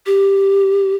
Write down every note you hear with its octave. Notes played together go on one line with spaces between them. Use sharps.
G4